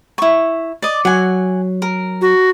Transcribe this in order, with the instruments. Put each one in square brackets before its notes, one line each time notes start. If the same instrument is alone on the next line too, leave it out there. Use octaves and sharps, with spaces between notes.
[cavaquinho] E4 C#6
D5 D#5
[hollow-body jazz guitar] F#3 [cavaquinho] F#5 G#5
[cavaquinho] A#4
[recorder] F#4